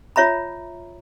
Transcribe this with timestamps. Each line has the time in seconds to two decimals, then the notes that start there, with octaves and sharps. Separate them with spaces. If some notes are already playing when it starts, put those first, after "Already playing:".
0.16 F4 C#5 E5 A#5 B5